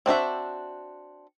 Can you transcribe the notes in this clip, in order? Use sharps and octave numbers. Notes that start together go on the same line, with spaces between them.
C4 D4 F#4 E5